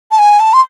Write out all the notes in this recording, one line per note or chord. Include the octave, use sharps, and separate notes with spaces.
A5
G#5
A5
C6